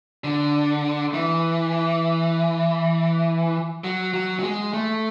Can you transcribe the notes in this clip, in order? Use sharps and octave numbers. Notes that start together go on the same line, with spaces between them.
D3
E3
F#3
F#3
F#3
G#3
A3